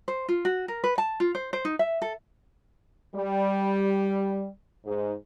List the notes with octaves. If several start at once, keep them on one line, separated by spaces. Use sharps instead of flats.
C5
F4
F#4
A#4
B4
A5
F4
C5
C5
D#4
E5
A4
G3
G#2